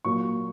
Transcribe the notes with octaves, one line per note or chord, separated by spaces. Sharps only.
A#2 F#3 A#3 C#6